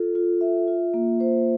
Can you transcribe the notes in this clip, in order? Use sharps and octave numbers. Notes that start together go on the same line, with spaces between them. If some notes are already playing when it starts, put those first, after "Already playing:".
Already playing: F4 A4
F4
E5
F4
A#3
C5